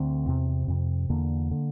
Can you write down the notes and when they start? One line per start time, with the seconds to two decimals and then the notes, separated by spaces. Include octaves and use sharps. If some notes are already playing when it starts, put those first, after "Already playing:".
Already playing: D2 D3 C4
0.26 E2 C3
0.68 F2 C3
1.10 E2 D3 A#3
1.51 D3